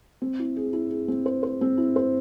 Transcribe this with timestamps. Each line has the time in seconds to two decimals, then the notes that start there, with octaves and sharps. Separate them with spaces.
0.22 C4
0.39 E4
0.56 G#4
0.73 E4
0.91 G#4
1.08 C4
1.26 C5
1.43 C5
1.61 C4
1.78 E4
1.96 C5